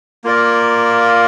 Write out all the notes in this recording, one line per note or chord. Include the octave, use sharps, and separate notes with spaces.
A#3 F4 A#4 D5